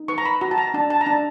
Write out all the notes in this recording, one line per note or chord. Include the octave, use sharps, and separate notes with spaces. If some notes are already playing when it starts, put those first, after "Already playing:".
Already playing: D#4
B4 C#6
A#5
B5
F#4 A#5
A5
A#5
D4 A5
A5
A#5
D4 A5